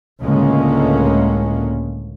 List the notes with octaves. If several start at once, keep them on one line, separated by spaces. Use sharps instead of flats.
C#2 A2 D3 G#3 A#3 C#4